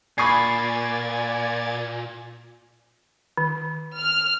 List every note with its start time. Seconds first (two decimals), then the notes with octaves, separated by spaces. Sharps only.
0.18 A#2 D5 G#5 B5 C#6 G#6 A6 C7
3.37 D#3
3.97 F6